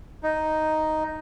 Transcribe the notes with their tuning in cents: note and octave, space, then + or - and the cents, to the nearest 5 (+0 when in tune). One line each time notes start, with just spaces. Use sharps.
D#4 +0